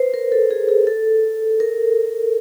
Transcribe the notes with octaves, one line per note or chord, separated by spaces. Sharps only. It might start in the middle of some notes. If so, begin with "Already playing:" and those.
Already playing: B4 C5
A#4
A4
G#4
G#4
A4
A#4